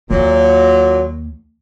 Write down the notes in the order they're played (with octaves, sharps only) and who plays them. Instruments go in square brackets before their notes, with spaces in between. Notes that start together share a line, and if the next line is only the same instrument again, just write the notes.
[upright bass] D#2 [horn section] A#2 F#3